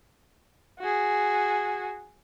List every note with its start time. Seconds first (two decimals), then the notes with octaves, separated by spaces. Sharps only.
0.80 F#4 G#4